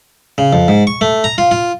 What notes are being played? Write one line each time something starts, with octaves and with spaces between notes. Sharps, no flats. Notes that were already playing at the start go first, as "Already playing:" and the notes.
C#3
F2
G#2
C#6
A3
A#5
F4
F4